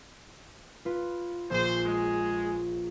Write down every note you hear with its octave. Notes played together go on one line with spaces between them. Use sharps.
F4 B4
A#1 G#4 C5 D#7
G#3